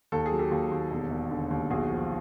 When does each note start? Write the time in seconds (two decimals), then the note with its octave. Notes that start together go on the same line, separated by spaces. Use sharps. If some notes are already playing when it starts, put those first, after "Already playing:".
0.12 D#2 A4
0.26 G#4
0.32 F#3
0.39 G4 A4
0.52 D#2
0.71 D#2
0.91 E1
1.11 E1
1.31 D3
1.51 D#2
1.70 B1 F#4 G#4
1.90 F3